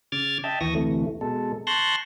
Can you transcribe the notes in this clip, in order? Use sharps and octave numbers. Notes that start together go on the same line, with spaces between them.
C#3 D6 F6 G#6 A6
D#5 E5 G5 A5
D#2 E3 C#6 D#6 A#6
D2 C3 E3 A3
B2 G#3 A4
A5 C6 C#6 F#6 G6 A#6